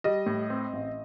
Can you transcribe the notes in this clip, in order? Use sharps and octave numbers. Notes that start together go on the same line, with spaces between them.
G3 D#5
A2
C4
A1